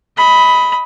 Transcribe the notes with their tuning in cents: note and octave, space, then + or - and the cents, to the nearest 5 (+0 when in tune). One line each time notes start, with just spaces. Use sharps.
D#5 +25 B5 +0